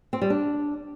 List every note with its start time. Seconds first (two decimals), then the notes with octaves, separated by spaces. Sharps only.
0.13 C4
0.22 G3
0.30 D4